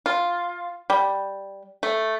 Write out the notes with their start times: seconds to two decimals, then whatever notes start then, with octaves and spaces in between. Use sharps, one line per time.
0.06 F4
0.90 G3
1.83 A3